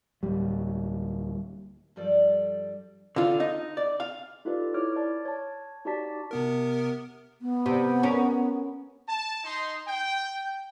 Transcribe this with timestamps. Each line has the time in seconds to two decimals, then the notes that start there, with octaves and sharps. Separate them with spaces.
0.23 D1 G3
1.96 G2 F3 G3 A4 D5
3.16 D3 F4
3.40 D#4
3.77 D5
4.00 F5
4.45 D#4 F4 G4 A4 B4 D5
4.74 E4 C#5 D6 F6
4.96 D5 A5
5.25 C#5 A5
5.85 D#4 F#4 G4 D5 A5 B6
6.31 C3 B3 A#4
7.41 B3
7.66 C3
8.03 C#4 A#4
9.08 A5
9.44 D#4 C6
9.87 G5